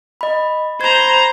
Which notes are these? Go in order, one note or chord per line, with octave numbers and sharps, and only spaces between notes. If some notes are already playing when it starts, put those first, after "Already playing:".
D#5 B5
C5 A#5 B5 G#6